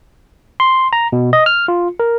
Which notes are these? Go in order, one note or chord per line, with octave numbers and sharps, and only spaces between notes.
C6
A#5
B2
D#5
F6
F4
A#4